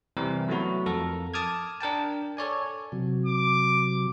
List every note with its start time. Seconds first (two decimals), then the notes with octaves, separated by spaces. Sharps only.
0.17 C3 E3 G3 A#4
0.48 F#3 A3 B3 E4 F#4
0.86 F2 A4 A#4 A#5
1.34 A5 D6 D#6 F6 G#6
1.80 D4 A#4 G5 A5
2.37 A4 C#5 D5 G#5
2.92 C3 F#3
3.26 D6